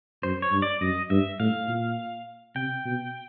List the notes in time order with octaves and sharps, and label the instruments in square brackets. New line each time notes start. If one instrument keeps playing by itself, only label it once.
[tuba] F#2 [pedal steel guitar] C5
[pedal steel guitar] C#5
[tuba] G2
[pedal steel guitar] D5
[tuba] F#2 [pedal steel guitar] D#5
[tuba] G2 [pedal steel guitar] E5
[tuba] A2 [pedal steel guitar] F5
[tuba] A#2
[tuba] C3 [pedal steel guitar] G5
[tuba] B2